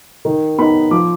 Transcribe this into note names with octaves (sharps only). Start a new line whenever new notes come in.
D#3
B3 D#4 B5
F3 D6